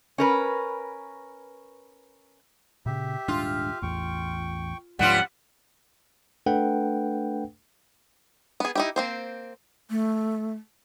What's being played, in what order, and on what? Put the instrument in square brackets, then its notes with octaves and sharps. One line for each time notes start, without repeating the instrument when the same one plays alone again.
[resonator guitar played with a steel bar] C#4 A#4 B4
[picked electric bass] A#2 C#3 [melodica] G4 E5
[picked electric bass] D#1 G#2 D4 [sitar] F4
[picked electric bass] A1 E2 [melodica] G5 C#6
[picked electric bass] D2 G#2 F3 [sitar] G3 B3 F4 [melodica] C#4 [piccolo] F#5
[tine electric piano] A3 D4 A4 B4 F#5 G5
[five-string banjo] B3 G#4
D#4 E4 G4
A#3 C4 C5
[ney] A3